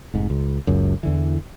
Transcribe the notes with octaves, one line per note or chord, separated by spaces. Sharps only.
F1 G#2
C#2
F#1 C#2 F#2
E2 D3 E3